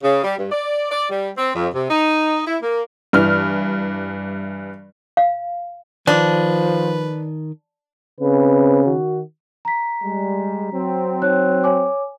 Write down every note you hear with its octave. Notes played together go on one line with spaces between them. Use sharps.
C#3
G3
G2
D5
D5
G3
C4
F2
C3
D#4
E4
A#3
G2 E3 F6
F5
D#3 F3 D4 B4
C#3 C4 B4
D#3 F#4
A#5 B6
G3 G#3
F#3 C4
D#4 C#5 F#6
C#5 G#5 D6